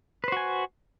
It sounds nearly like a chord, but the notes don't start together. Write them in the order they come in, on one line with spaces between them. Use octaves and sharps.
B4 C5 F#4 G#5